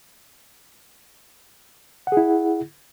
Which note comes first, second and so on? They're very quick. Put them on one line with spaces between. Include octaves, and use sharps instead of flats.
F#5 G#4 E4